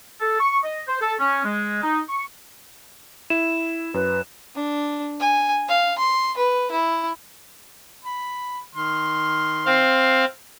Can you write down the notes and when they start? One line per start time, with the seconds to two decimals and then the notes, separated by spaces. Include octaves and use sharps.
0.21 A4
0.40 C#6
0.64 D#5
0.87 C5
1.00 A4
1.19 C#4
1.45 G#3
1.83 D#4
2.08 C#6
3.30 E4 E7
3.94 F#2 B4
4.55 D4
5.20 G#5
5.68 F5
5.98 C6
6.37 B4
6.70 E4
8.05 B5
8.75 D#3 C6 F6
9.66 C4 F5